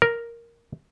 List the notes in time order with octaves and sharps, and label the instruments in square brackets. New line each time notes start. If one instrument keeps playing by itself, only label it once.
[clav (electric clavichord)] A#4